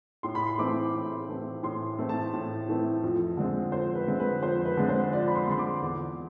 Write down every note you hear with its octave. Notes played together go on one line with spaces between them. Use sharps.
A2 C6
B5
C6
E3 A3 C4 D6
A2
E3 A3 C4
A2 C6
E3 A3 C4
A5
A2
E3 A3 C4
F2
D3 G#3 C4
F2 C5
B4
D3 G#3 C4
B4
F2 C5
B4
D3 G#3 C4
C5
F2 D5
B5
C6
D3 G#3 C4 C6
D6
E2